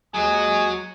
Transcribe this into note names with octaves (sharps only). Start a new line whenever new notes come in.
D#2 F#3 G#3 F#4 G#5 D#6